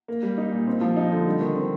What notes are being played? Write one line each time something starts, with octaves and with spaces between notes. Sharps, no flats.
A#3
G3
D#4
A#2
C4
F3
D#4
D3
G3
D#3
C4